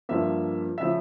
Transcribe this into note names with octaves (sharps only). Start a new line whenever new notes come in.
G2 F3 A#3 E5
C#3 F3 E5